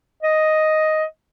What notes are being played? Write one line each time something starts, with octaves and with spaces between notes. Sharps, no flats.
D#5